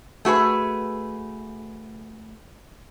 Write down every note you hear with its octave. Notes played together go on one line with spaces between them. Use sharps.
A3 F#4 G#4 B4